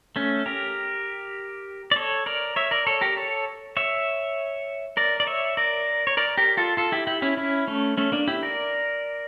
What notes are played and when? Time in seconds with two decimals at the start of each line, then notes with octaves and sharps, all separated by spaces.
0.16 A3 C#4
0.46 G4 A#4
1.91 D5
1.96 A4 C#5
2.26 A#4 D5
2.56 C#5 E5
2.71 A#4 D5
2.87 A4 C#5
3.01 G4 A#4
3.17 A4 C#5
3.77 C#5 E5
4.97 A#4 D5
5.20 D5
5.27 C#5 E5
5.57 A#4 D5
6.07 C#5
6.17 A#4 D5
6.37 G4 A#4
6.57 F4 A4
6.77 F4 A4
6.92 E4 G4
7.07 E4 G4
7.22 C#4 E4
7.37 C#4 E4
7.67 A3 C#4
7.97 A3 C#4
8.12 A#3 D4
8.28 E4 G4
8.43 A#4 D5